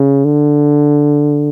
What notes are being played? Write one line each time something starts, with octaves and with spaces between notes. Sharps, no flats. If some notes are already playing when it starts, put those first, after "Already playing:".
Already playing: C#3
D3